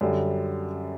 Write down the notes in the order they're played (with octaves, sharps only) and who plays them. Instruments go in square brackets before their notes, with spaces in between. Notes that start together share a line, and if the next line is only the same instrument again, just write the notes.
[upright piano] F#2 D3 G3